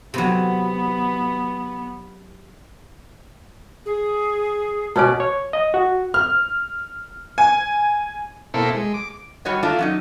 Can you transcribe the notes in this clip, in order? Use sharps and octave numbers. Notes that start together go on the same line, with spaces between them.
C3 F#3 B3
G#4
B2 C#4 D5
C#5
D#5
F#4
F6
G#5
B2 A#3 C4 E4 A4
G#3
D6
G3 F#4 C#5 D#5
A3 A#3 D4 F4
F#3 C#4 D#4